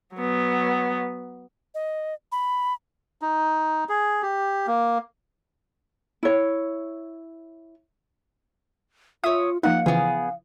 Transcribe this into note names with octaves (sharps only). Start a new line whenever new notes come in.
F#3 B3
D#5
B5
D#4
G#4
G4
A#3
E4 C#5
F4 C#5 E5 D#6
F3 A#3 D#4 F5 F#5
C#3 E3 F3 B3 G#4